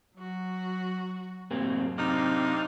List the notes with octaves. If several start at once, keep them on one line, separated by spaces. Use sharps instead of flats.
F#3 F#4
F#2 A2 C3 A#3 C4
C3 C4 D4 D#4 F5